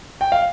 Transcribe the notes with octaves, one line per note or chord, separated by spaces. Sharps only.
G5
F5